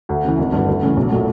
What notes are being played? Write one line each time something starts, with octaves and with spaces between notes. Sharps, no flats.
D2
C#3 E3
G#1
G2 D3
D2
C#3 E3 A3
B1
A#2 F#3 A3